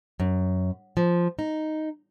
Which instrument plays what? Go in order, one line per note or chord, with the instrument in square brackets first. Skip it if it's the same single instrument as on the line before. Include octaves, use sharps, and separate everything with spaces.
[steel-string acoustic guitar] F#2
F3
D#4